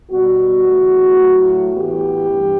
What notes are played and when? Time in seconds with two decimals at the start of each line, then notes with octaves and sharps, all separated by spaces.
0.11 B2 G3 B3 F#4
0.66 E2 D3 A3
1.20 A2 F#3 A3
1.74 A2 E3 B3 G4
2.29 G2 E3